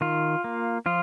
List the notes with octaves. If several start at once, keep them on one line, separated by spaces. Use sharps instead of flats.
D#3 F4
A#3
F3 F4